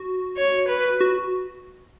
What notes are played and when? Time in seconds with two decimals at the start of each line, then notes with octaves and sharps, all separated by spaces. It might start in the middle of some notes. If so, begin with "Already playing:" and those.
Already playing: F#4
0.37 C#5
0.68 B4
1.01 F#4